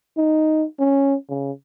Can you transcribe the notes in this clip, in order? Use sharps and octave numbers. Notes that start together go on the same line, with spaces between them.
D#4
C#4
C#3